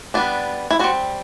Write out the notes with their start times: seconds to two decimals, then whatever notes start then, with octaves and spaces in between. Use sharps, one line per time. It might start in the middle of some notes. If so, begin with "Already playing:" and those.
0.14 G3 B3 D4
0.71 E4
0.79 G3 C4 F#4